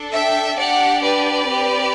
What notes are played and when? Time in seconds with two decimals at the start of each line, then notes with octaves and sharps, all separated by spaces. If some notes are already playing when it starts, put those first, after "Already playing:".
Already playing: D4 A4
0.14 E5 G5
0.58 D4 G4 D5 F#5
1.03 B4 D5
1.49 C4 G4